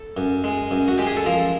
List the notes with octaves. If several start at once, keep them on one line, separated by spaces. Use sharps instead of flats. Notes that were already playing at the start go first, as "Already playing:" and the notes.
Already playing: A4
F#2
G#3
F#2
F#4
G#3 G4
G#4
A4
F3 A#4